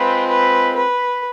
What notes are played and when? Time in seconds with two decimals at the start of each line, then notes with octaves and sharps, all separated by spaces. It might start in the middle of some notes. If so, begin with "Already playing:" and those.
Already playing: G#3 C4 F4 B4
0.30 B4
0.76 B4